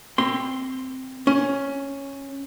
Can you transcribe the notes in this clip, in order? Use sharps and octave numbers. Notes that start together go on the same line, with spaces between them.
C4 C6
C#4